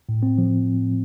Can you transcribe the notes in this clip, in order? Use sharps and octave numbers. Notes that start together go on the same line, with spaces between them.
A2
C4
F3